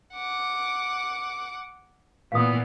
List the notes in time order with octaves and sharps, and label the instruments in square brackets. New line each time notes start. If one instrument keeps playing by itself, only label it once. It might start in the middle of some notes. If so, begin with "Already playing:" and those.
[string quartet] F#5 D6
[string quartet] A#2 E3 B3 [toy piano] F5 D#6